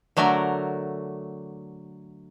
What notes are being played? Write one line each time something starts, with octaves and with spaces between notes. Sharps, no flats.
D3 F#3 A3 A#4 A#5